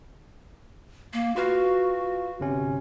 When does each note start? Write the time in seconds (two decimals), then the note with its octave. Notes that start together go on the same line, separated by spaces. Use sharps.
1.13 A#3
1.36 F4 F#4 B4 F5
2.40 G1 C3 C#4